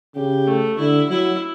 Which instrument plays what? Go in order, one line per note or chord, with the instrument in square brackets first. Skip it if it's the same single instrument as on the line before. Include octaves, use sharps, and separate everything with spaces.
[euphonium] C#3 [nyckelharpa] G4
[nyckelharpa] A3
[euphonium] D3 [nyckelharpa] E4
[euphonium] F#3 [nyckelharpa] E4